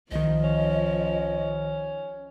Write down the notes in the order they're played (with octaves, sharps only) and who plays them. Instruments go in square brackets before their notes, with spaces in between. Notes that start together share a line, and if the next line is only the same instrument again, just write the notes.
[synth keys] C2 D#3 [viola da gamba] F3 [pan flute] D#5
[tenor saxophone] C#4